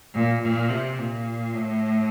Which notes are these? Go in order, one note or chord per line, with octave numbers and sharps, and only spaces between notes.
A#2
A#2
C3
A#2
A2